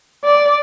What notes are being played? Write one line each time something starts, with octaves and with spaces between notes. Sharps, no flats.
D5